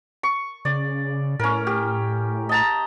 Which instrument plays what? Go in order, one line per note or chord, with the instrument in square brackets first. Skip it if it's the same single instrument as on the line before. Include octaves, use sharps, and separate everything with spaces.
[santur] C#6
[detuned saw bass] C#3 [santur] D5
[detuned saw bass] A2 [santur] C#4 A#4
[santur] G4
D#5 A5 A#5